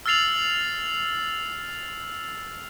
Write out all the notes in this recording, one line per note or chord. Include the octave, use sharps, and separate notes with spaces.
E6 F6 A6 C7 F7 F#7